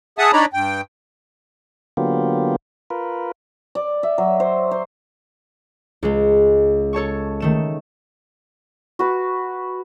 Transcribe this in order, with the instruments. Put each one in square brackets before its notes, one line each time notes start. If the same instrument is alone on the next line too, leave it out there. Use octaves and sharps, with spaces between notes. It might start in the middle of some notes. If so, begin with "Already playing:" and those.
[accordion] G#4 E5 F#5 A5 D#6
D4 D#4 C#5 D5 A#5 B5
G2 G5
[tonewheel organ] D3 F#3 A#3 B3 F4 G4
F4 A#4 B4
[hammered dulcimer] D5
E5
F#3
C5
C5
[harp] C#2 G#3
A4 C#5 A5 C#6
D#3 A3 E7
[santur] F#4 B4